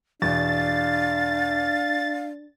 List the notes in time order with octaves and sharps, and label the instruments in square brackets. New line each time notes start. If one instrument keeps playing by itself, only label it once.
[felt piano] E2 B2 [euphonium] D4 [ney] F5 [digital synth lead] A6